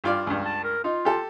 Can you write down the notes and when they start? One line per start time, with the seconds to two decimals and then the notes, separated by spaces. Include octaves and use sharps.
0.04 G2 F4 D5
0.27 C#2 G2
0.46 A5
0.64 A#4
0.84 D#4 F4
1.05 G4 A4